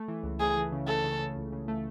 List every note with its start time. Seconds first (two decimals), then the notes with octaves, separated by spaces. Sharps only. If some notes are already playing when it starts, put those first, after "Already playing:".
Already playing: A3
0.08 E3
0.23 C#2
0.40 A3 G#4
0.56 E3
0.72 C#3
0.88 A3 A4
1.04 C#3
1.19 C#3
1.36 C#2
1.53 C#3
1.68 A3